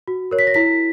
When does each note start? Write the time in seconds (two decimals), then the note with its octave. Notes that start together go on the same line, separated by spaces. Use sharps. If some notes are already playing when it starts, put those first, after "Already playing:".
0.08 F#4
0.31 A#4 C#5
0.39 B6
0.47 A#6
0.54 E4 B6